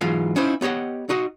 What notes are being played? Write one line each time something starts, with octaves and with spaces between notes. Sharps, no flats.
G#2 E3 F#3 F4 F5
C#4 D#4 E4 C5 F5
B3 G4 C#5 D#5 F#5
D#4 F#4 D#5